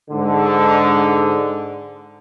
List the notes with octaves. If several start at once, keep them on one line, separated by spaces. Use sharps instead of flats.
G#2 D3